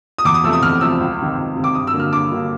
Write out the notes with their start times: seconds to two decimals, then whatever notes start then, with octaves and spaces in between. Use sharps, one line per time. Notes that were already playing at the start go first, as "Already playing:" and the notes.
0.18 D#6
0.25 E2 D6
0.34 D#6
0.43 C3 F3 A3 E6
0.53 D#6
0.62 E2 F6
0.81 C3 F3 A3 E6
1.00 C#2
1.19 C3 D#3
1.37 C#2
1.56 C3 D#3
1.64 D6
1.74 G2 D#6
1.87 E6
1.93 D3 F#3 A#3
2.00 F6
2.12 G2 D6
2.31 D3 F#3 A#3